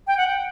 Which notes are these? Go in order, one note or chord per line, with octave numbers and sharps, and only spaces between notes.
G5
F#5
G5